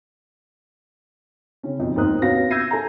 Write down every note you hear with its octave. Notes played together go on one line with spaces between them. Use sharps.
C#3 C4 C#4
B1 F2
D#2 G#2 A#4 C5 D#6 F#6
C3 B3 C#4 F#4 F5 A#6
E6 G6 G#6 A#6 C7 D#7
A4 G#5 A#5